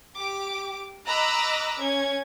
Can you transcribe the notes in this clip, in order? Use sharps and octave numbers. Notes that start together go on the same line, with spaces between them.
G4 D6
D#5 A#5 B5 D6 E6 F#6
C#4 G#6